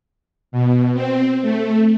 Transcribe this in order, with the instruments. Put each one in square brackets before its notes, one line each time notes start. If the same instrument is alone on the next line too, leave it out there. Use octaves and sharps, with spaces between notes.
[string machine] B2
C4
A3